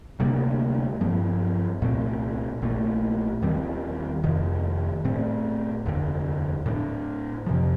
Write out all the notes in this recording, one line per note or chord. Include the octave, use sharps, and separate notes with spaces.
D2 C3 G3 A#3
G2 F3 C4
C2 A#2 A3 C4
A#1 A#2 A3
D#2 D#3 G3 C4
F1 F2 D#3
A2 A3 C4
F1 D#2 D3
A2 G3 D4
F2 C3 F3